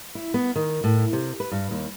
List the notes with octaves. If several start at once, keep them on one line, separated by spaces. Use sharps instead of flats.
E4
B3
D#3
A2
C3
B4
G2
D#2